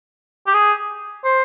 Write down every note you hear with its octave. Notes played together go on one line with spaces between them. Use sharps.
G4
G#4
C5